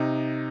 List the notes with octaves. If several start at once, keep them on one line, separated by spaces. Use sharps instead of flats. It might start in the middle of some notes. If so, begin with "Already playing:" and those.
Already playing: C3 D#4